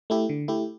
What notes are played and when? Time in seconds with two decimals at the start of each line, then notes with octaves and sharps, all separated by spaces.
0.10 A3 E4 G4
0.29 D3
0.48 A3 E4 G4